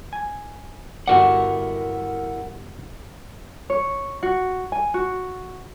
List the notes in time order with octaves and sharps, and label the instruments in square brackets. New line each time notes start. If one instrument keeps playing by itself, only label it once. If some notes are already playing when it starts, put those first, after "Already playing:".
[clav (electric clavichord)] G#5
[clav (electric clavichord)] G1 F#4 D5 [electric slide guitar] E4 A#4 F#5
[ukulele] C#5
F#4
G#5
F#4